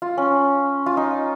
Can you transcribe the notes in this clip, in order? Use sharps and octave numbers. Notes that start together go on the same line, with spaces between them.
F4
C#4
F4
D#4